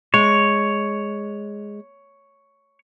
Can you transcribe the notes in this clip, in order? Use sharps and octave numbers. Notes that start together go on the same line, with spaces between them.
G#3 C#5